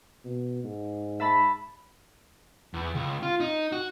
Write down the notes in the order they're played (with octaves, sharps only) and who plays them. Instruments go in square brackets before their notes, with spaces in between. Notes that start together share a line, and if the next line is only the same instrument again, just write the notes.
[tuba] B2
G#2
[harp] E5 A5 B5
[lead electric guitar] E2
C#2
F4
D#4
F#4